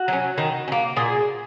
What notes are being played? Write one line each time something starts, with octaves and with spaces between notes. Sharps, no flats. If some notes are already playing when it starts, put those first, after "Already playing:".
Already playing: F#4
F#3 C#4
D#3
C#4
A#3
A#2 G#4